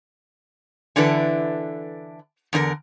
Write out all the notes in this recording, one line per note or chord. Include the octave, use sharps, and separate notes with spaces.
D3 E3 D4 E4 A4 B4
E2 D3 D4 A#4